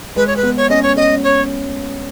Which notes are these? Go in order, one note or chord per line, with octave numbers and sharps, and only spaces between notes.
G#3 B4
C#5
B4
B3
C#5
C#4 D#5
C#5
C#4 D#5
C#5